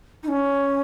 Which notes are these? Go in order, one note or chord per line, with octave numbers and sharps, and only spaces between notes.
D#4
C#4